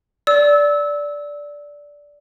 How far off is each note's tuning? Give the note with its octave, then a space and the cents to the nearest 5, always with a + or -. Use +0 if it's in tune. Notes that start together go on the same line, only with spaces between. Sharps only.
D5 -10 E6 -20